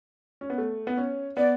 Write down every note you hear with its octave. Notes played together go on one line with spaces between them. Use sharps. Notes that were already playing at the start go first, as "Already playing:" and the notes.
C#4
B3
A3
B3
C#4
B3 D5